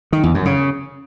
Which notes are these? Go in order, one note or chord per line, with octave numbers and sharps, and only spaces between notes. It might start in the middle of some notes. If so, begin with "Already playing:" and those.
D#3
E2
F#2
C#3